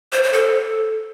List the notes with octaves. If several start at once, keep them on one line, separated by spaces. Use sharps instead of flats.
C5
C5
A4